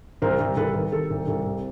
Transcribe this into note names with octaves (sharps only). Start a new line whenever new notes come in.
C2 A#4 C5
C2
C2 A4 B4
D#3
D#3 A4
C2
C2 A4
C3